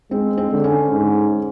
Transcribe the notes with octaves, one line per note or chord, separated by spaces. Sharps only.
G#3 C4
C4
D3
C#4
G#2